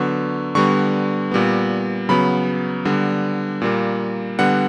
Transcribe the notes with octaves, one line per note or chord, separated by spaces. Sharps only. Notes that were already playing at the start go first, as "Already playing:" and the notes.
Already playing: D3 F#3 B3 C#6
D3 G3 B3 C#6
A#2 G3 B3
C#3 F#3 B3 B5
D3 G3 B3
A#2 G3 A#3
D3 G3 B3 F#5